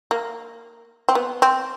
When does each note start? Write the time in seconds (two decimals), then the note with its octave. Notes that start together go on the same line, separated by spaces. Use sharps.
0.11 A#3
1.09 C4
1.15 B3
1.42 C4